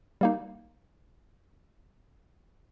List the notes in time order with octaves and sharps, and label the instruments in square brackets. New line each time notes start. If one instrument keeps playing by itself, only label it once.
[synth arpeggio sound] G3 A#3 D#4